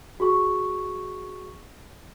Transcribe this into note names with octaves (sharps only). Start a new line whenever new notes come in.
F#4 G#4 C#6